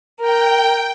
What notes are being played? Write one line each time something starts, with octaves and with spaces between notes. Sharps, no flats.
A#4 G5